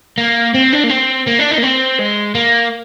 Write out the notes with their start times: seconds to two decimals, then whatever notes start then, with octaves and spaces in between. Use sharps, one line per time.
0.18 A#3
0.54 C4
0.73 D4
0.84 A#3
0.89 C4
1.27 A#3
1.39 D4
1.51 D#4
1.58 A#3
1.63 C4
1.99 G#3
2.35 A#3